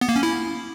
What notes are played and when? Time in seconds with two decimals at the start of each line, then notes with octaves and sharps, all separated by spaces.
0.01 B3
0.09 A#3
0.16 C#4
0.23 E4